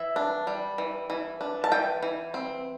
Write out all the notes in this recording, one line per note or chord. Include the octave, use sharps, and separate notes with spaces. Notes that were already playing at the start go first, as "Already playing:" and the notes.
Already playing: E3 E5
D4
G3
E3
E3
D4
A5
E3 G5
E3
C4